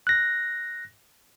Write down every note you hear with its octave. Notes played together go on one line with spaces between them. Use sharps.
F#6 A#6